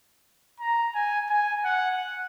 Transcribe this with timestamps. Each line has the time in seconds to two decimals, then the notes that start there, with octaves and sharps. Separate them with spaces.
0.60 A#5
0.95 G#5
1.29 G#5
1.65 F#5